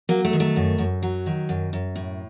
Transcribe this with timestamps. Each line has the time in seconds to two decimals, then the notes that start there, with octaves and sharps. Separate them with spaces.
0.09 F#3 A#3
0.25 A3
0.33 D#3
0.40 A3
0.56 F#2
0.78 F#2
1.02 F#3
1.26 D#3
1.49 F#2
1.73 F#2
1.96 A2